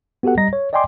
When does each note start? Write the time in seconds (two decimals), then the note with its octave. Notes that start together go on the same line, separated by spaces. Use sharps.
0.23 B3 F#4 G4 A4 F#5
0.37 G3 D#5 A#5 A#6
0.53 C#5
0.73 D5 D#5 G5 G#5 C6 D6